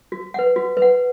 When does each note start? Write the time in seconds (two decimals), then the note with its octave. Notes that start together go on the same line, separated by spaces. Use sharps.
0.12 F#4
0.34 B4 F#5
0.56 F#4
0.77 B4
0.82 F#5